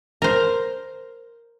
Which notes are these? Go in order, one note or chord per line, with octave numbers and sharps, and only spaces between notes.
A#4 C5